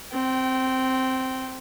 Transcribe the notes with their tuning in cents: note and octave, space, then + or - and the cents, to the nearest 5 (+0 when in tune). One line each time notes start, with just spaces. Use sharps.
C4 +0 G5 -20